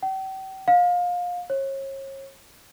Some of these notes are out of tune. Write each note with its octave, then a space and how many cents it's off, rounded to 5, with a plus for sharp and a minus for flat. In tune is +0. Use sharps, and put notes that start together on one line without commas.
G5 -40
F5 +25
C#5 -35